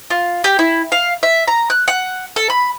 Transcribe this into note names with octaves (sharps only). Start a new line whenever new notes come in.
F4
G4
E4
F5
E5
A#5
F#6
F#5
A4
B5